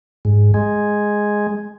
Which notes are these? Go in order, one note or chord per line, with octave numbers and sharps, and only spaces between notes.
G#2
G#3